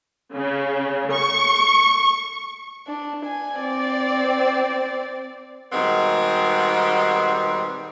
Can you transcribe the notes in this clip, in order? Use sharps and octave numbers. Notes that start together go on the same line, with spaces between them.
C#3
C#6
D4
G#5
C4 D5
B2 D#3 G3 G#3 B3 C4